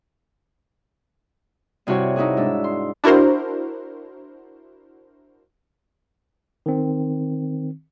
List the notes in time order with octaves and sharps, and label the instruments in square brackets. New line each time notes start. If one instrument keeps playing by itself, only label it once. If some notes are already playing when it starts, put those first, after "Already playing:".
[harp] G2 C3 E4 F#4 C#5
D#4 E4 F#4 G#4
G#2 D4 E6
C6
[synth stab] D4 E4 F#4 A#4 C5
[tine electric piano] D#3 C4